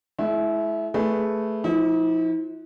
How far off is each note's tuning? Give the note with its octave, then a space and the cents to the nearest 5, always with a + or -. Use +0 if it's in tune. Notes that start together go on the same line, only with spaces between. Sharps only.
G#3 +45 E4 +0
A3 +0 G#4 +0 B4 +0
F3 +0 E4 -45